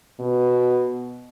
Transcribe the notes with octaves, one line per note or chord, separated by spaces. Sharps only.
B2